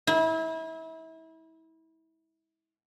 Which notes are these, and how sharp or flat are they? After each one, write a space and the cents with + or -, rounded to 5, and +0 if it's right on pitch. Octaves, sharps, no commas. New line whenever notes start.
E4 -30